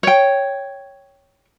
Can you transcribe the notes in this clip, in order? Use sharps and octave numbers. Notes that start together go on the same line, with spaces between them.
C#5 G5